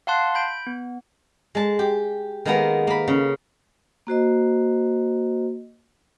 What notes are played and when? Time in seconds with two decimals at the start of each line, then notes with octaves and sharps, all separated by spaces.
0.07 F5 F#5 A5 C6 F#6
0.35 B5 G6 D7
0.67 B3
1.55 G#3 A5
1.79 G4
2.45 D#3 G#3 A#3 B3 A#5
2.87 A#3 B5
3.08 C#3
4.07 A#3 F#4 C5 D#5